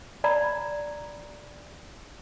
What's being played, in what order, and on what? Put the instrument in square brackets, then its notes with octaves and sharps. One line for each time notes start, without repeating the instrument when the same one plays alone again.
[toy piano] D5 A#5 B5